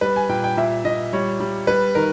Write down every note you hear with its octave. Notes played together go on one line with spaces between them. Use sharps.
G3 B4
G#5
A#2 G5
G5
A#2 E5
A#2 D#5
G3 C#5
G3
G3 B4
D#3 A#4